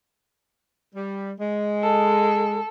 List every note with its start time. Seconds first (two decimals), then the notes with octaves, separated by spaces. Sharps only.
0.94 G3
1.39 G#3
1.83 A4